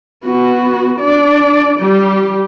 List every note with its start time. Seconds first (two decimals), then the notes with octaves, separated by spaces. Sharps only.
0.25 B3 F#4
1.00 D4 D5
1.79 G3 G4